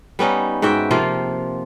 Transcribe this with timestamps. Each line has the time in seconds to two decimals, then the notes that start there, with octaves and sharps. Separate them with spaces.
0.19 G3 B3 C#4 D#4
0.62 G#2 F#4 E5 G5
0.91 C3 F3 A#3 F4